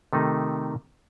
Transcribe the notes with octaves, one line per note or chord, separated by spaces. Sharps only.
C3 D#3 A3 D#4